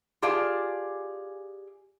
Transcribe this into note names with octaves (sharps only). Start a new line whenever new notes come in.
F4 G4 G#4 D5 F5 A5